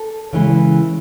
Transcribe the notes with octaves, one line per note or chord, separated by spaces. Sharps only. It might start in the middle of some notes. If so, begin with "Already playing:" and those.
Already playing: A4
C#3 E3 G#3